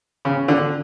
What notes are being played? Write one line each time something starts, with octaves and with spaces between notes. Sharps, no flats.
C#3
D3